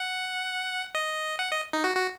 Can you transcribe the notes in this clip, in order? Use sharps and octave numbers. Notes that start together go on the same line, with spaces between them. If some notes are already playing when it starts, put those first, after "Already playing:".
Already playing: F#5
D#5
F#5
D#5
D#4
F#4
F#4